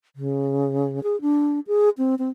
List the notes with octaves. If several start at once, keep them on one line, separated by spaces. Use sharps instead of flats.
C#3
G#4
D4
G#4
C4
C4